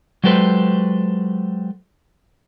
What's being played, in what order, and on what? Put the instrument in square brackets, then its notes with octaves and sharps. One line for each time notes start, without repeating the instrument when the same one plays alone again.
[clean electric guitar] F#3 G#3 G4 A4 B4 C5